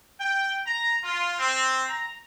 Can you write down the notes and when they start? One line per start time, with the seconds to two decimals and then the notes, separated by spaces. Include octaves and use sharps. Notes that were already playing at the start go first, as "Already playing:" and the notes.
0.19 G5
0.66 A#5
1.03 F4
1.39 C4
1.89 A#5